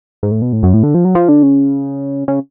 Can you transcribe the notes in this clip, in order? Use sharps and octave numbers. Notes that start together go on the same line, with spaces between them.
G#2
A2
B2
A2
F#2
A2
D3
F3
F#3
F3
D3
C#3
C#3